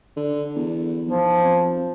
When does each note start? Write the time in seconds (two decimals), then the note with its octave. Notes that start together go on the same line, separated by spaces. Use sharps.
0.16 D3
0.55 E2
1.06 B1 F3
1.44 F2